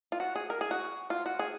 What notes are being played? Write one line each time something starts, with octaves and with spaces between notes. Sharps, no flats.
F4
F#4
G#4
A#4
G#4
F#4
F4
F#4
G#4